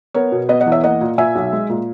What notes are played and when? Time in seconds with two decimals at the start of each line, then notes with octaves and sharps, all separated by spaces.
0.14 B3 A#4 C#5
0.32 B2
0.49 B3 B4 D#5
0.61 D#5 F#5
0.66 E2
0.72 C#5 E5
0.83 A#3 D#5 F#5
1.01 A#2
1.18 A#2 E5 G#5
1.35 B1
1.53 G#3
1.69 A#2